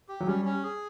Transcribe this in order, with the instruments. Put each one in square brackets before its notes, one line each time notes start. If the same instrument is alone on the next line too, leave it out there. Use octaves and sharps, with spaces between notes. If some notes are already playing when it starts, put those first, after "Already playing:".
[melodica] G4
[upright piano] F#3
[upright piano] G3 [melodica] C#4
[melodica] C#4
G#4